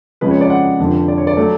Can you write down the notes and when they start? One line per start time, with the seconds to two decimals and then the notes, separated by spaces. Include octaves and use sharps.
0.21 F2 C#3 G#3 B4
0.31 C#5
0.41 D5
0.50 F#5
0.79 F1 F2 D3
1.08 D5
1.18 C#5
1.27 D5
1.37 F#3 A3